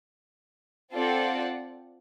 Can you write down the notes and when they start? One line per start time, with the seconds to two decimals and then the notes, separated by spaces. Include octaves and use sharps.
0.93 C4 F4 A4 D5 F#5